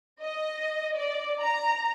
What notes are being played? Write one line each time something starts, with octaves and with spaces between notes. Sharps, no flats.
D#5
D5
A#5